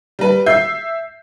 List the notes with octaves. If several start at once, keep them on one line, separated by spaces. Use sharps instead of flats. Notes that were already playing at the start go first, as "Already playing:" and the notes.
G3 B4
E5 G6 C7